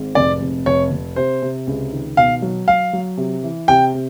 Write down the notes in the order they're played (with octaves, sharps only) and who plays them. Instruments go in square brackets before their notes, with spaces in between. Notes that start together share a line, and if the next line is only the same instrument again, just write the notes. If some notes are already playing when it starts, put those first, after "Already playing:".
Already playing: [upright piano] G#1 G#2
[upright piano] F1 [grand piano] D5
[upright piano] F1
[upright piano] F1 [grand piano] C#5
[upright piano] F1
[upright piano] C3 [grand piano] C5
[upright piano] C3
C#2
D#3
[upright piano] B2 [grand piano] F5
[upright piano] F#3
[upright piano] F#3 [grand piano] F5
[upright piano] F#3
C3
E3
[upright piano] C3 [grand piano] G5
[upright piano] C3